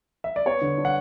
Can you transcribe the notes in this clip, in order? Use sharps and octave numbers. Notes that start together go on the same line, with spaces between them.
E5
D5
B3 C#5
D3
D4
F#5